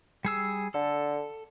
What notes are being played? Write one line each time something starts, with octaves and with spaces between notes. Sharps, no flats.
G3 G#4 E6
D3 A4